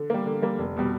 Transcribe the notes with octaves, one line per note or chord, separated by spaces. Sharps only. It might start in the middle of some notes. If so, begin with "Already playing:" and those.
Already playing: D3
G3 A#3
D3
G3 A#3
F1
B2 G3